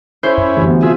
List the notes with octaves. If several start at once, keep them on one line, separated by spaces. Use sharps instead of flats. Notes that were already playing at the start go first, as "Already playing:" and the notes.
C#4 E4 C5
F#2
D2 E3 G3
B3
C3 F4 G4 G#4 E5